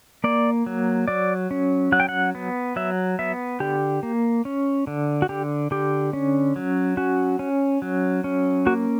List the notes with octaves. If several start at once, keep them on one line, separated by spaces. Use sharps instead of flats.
A#3 D5
F#3
F#3 D5
C#4
F#3 F#5
G5
F#5
B3
F#3 E5
B3 E5
D3 G4
A#3
C#4
D3
F#4
D3 G4
D3 G4
C#4
F#3
C#4 F#4
C#4
F#3
C#4
A#3 F#4